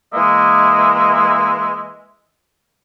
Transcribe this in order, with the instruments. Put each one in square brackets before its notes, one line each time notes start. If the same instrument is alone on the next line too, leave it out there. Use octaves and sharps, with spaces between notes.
[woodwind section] E3 G#3 A#3 D#5 E5